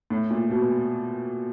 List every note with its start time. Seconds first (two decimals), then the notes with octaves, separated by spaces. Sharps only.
0.10 A2
0.30 A#2
0.50 B2